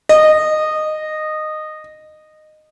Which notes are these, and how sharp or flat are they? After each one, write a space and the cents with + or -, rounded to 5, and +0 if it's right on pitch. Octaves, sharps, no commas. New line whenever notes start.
D#5 -15